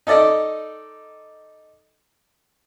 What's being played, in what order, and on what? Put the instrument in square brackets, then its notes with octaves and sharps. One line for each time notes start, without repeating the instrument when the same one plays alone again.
[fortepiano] D#4 A4 D5 D#5